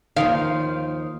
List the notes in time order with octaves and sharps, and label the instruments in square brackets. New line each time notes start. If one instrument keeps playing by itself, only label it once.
[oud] D#2 F5 [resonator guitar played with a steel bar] D#3 F3